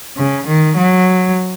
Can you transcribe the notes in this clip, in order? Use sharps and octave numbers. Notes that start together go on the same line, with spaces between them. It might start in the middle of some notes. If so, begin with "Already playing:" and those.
C#3
D#3
F#3